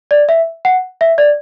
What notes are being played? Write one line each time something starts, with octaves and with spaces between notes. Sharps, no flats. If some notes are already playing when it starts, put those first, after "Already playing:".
D5
E5
F#5
E5
D5